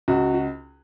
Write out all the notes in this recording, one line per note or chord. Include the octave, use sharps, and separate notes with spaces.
C#2 F#4
F#4